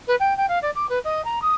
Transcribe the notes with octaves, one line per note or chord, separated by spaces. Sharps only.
B4
G5
G5
F5
D5
D6
B4
D#5
A#5
D#6